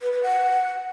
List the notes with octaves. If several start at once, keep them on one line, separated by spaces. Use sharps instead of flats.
B4
B4
F#5